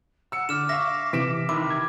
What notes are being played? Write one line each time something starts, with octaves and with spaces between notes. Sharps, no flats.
F#5 E6 C#7
D3 D6 F6 E7
E5 F5 C#6 A#6
C3 E3 B6 D7 E7
C3 D#3 E3 E5 B5 C6 D6
G#6